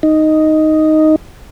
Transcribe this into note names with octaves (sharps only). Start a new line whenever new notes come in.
D#4